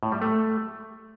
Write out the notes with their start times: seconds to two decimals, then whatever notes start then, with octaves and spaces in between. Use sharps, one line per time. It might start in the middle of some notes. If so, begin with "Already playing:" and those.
0.03 A2
0.12 G3
0.22 A3